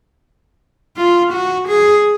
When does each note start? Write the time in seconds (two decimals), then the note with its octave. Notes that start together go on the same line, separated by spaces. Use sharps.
0.97 F4
1.32 F#4
1.68 G#4